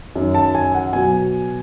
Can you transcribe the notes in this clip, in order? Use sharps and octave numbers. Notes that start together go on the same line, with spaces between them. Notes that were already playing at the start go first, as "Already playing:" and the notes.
F#2 D#3 F#3
A5
G#5
F#5
B2 F#3 G#5